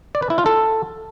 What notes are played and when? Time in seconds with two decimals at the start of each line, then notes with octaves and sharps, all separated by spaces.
0.15 D5
0.22 B4
0.30 E4
0.38 F4
0.46 A4